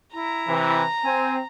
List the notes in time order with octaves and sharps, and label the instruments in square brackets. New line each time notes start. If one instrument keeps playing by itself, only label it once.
[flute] E4 [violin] A#5
[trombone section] C3 E3
[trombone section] C4 [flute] G#5